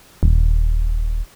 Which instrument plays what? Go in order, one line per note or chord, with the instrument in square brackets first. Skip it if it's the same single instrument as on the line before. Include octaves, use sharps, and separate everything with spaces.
[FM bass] D#1